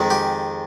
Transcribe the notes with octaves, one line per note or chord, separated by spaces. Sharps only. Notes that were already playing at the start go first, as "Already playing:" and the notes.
Already playing: F2 D#3 G#3
G4